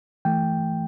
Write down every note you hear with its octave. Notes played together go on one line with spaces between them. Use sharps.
E3 A3 G5